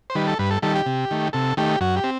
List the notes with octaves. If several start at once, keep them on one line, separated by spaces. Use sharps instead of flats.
C5
D#3 G3 B4
A4
G2 B4
A4
D#3 G3 A4
G4
C3
D#3 A3
C3 A4
D#3 A3 G4
F#2 F#4
G4
C4